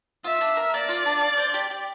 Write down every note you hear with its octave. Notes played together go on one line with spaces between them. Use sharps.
F4 E5
D4
A#4
A#3 D5
F4
D4
F5
C5
G4
G4